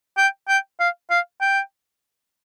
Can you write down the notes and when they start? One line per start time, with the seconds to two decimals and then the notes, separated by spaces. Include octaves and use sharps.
0.18 G5
0.48 G5
0.80 F5
1.10 F5
1.41 G5